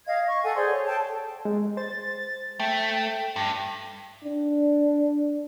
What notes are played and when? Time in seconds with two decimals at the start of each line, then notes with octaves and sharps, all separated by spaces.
0.06 D#5 F5 G#6
0.28 C#6
0.43 A4 F#5 G#5
0.56 G#4 C5 D5 C6
0.71 C#5
0.86 A4 G5 A5
1.45 G#3
1.77 C5 A6
2.60 A3 G5
3.36 G2
4.24 D4